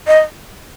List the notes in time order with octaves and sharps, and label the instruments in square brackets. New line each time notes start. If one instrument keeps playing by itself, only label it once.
[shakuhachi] D#5